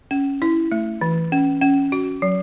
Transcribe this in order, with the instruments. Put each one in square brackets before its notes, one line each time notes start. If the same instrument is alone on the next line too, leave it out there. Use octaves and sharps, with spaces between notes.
[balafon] C#4
E4
A3
E3
C#4
C#4
F#4
F#3